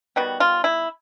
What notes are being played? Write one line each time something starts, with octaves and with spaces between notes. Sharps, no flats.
D#3 G3 B3 F#4
F4
E4